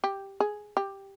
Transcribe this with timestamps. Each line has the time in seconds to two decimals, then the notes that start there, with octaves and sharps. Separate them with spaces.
0.04 G4
0.40 G#4
0.77 G4